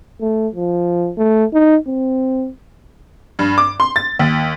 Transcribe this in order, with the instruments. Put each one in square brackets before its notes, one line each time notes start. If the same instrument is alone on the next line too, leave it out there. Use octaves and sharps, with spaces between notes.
[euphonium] A3
F3
A3
D#4
C4
[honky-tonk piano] G2
D6
C6
A6
D#2